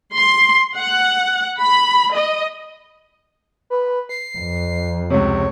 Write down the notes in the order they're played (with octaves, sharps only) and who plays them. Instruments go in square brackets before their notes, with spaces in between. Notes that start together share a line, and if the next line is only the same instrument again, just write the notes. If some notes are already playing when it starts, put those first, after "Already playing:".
[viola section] C6
F#5
B5
D#5
[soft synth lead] B4
C7
[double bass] F2
[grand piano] C#2 C3 [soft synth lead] C#5